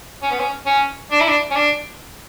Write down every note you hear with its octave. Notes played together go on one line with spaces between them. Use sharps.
C#4
B3
C#4
C#4
D4
E4
D4
C#4
D4